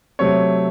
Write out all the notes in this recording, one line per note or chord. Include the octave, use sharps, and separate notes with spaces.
C3 F#3 A3 C4 C#5